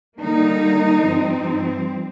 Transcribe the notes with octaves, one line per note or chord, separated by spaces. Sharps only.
D3 G3 A#3 D#4
G2 F3 C4